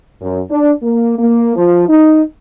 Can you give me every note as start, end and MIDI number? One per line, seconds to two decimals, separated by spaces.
0.22 0.39 42
0.50 0.70 62
0.83 1.15 58
1.19 1.52 58
1.56 1.86 53
1.89 2.21 63